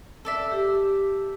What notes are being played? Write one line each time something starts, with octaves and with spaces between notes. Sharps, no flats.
A4 D5 E5
G4